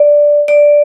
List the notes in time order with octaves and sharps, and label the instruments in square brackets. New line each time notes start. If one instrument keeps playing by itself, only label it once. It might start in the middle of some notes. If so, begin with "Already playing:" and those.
Already playing: [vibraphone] D5
D5